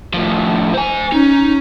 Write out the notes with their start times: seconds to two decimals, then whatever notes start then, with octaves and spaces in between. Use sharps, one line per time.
0.14 A2 F3
0.74 C5 G#5
1.12 C#4 D#4